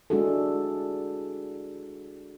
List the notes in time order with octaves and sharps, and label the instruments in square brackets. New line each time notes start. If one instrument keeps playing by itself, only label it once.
[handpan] G#3 D4 E4 F#4 G#4 A4